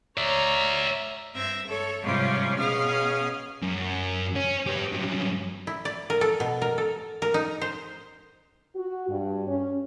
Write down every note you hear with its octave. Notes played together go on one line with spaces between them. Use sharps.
C#5 D5 E5 A#5
G2 C4 E5 G#6 A#6
A4 C#5
G#2 C3 F3 G3 C#4 F4
B2 C#4 G#4 F5 D#6 F6
F#2
C#4
G4 B4
G2 F#3
E4
D5
A#4
A4
B2
A#4
A4
A#4
D#4
C5
F#4
G2
C#4